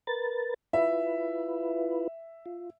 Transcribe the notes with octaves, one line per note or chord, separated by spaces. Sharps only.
A#4 B4 A6
E4 F4 B4 E5
F4